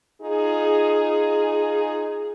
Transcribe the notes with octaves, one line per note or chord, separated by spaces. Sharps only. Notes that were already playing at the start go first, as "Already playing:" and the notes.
D#4 F4 G#4